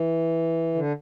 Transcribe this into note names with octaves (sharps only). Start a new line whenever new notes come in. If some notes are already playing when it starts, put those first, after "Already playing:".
Already playing: E3
D3